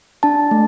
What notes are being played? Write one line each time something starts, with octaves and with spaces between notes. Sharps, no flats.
D4 A5
A3